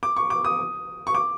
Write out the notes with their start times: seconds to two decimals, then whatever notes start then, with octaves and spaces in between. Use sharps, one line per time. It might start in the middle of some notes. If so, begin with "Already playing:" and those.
0.03 D6
0.16 C#6
0.30 D6
0.45 D#6
1.07 C#6
1.15 D6